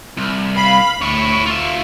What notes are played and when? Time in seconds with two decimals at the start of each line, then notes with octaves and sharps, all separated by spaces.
0.18 C2
0.56 F5 B5
1.02 D2 E4 C#5 C#6
1.47 F4 E5